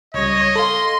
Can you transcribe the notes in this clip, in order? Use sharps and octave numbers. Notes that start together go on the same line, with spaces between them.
C#2 G3 C#5 D#5
A4 F5 C6